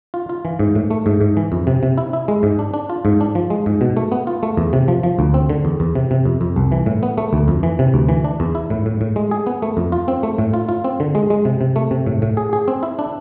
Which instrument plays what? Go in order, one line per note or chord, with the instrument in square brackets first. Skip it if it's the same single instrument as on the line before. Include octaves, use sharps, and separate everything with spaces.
[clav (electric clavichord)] F4
F4
E3
G#2
A2
A3
G#2
G#2
E3
F2
C3
C3
E4
E4
G#3
G#2
D4
D4
F4
G#2
D4
F3
G#3
G#2
B2
A3
B3
F4
A3
E2
C3
F3
F3
D2
C4
D3
E2
E2
C3
C3
F2
F2
C2
E3
A2
B3
A3
D2
F2
E3
C3
D2
E3
D4
E2
E4
A2
A2
A2
G#3
G#4
B3
A3
F2
F4
C4
A3
A2
F4
F4
C4
D3
G#3
G#3
C3
C3
A3
C3
A2
A2
G#4
G#4
C4
E4
D4